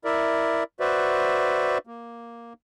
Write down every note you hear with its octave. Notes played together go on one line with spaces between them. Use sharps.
E4 A#4 D5 E5
F#4 B4 C5 D5 E5
A#3